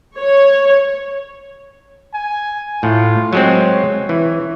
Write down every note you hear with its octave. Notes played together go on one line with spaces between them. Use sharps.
C#5
G#5
A2 F4
F#3 G#3 C4 C#5
E3